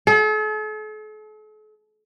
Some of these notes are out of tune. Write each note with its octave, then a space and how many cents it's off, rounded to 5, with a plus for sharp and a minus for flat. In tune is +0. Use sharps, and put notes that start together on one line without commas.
A4 -45